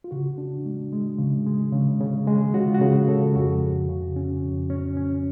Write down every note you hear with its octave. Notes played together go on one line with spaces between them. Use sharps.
F4
C#3 F#4
D4
G#3
G#3
C#3
G#3
C#3
C#3
G#3
C#3 F#4
F4
F#4
C#3 G#4
C#3 A4
F2 F#4
F2
C#3
C#4
F2
C#4
C#4